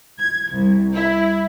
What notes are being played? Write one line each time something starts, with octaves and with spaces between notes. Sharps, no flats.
G#6
C2
E4